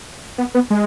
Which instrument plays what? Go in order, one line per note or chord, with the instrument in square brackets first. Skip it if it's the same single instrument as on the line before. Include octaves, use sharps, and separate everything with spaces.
[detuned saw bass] B3
B3
G#3